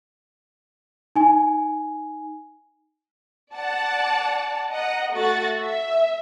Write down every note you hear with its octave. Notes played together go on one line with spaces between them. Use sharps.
D#4 G#5
D5 F#5 A5
D#5 F#5 A#5
A3 F#4 F#5 A6
E5